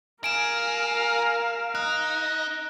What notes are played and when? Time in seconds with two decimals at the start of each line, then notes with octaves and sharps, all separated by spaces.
0.24 G#4 A#4 F5 D7 E7
1.75 D#4 F#6